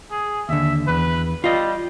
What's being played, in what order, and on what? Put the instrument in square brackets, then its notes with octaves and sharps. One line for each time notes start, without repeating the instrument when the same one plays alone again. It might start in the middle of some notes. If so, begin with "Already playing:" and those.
[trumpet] G#4
[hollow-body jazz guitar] D#2 D3 [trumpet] E5
[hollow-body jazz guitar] E2 [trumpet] B4
[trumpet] G3 [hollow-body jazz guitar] F4 D#5